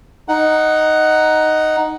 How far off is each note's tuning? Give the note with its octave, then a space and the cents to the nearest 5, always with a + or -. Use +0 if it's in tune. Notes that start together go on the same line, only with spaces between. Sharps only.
D#4 +0 F#5 +10